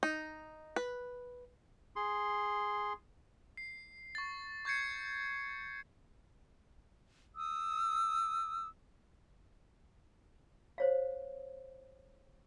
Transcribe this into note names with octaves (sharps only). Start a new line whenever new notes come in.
D#4
B4
G#4 C6
C7
C#6 A6
C#6 G6 G#6 C7 C#7
D#6 E6
C5 C#5 F5